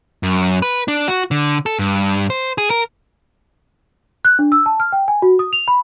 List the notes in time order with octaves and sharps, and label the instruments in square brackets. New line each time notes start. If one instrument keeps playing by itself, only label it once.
[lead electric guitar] F#2
B4
D4
F#4
D3
A4
G2
C5
G#4
A#4
[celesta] F#6
D4
E6
A5
F6
G5
G#5
F#4
D#6
F7
B5